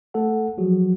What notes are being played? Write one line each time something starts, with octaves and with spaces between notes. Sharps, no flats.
A3 A4 F#5
F3 F#3 F#4 G#4